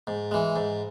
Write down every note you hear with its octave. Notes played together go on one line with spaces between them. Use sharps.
G#2
E3 G#3
G#2